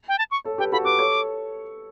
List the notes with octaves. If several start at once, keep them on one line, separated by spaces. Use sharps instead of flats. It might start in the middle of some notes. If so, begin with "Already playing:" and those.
G5
A5
C#6
A4 C#5
G4 B4 G5
F#4 A4 B5
G4 B4 D6
A4 C#5